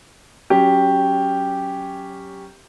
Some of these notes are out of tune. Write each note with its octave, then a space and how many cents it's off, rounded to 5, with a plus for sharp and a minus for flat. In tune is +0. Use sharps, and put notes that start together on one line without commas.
F#3 +15 C#4 +0 G4 +0